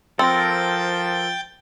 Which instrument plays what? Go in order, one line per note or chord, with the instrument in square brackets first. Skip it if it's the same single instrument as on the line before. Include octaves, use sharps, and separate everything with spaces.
[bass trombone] F3 [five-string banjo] C4 [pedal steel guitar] A4 A#4 [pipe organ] G5 G6 A6